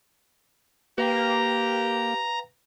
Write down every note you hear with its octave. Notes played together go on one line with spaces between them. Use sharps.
A#3 G4 B4 F5 G5 A#5